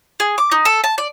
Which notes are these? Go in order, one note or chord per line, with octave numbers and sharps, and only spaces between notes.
G#4
D6
D#4
A4
A5
D5